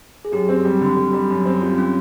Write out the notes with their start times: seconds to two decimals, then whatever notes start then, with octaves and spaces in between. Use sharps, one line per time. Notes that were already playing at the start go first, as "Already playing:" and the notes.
0.25 G#4
0.32 F#2 G4
0.49 C4
0.65 G3
0.81 D3
0.97 G3
1.13 G3
1.30 F#2
1.45 C4
1.62 G3 F4
1.78 C#4